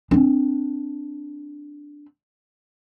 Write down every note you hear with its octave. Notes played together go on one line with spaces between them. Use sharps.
C4 D4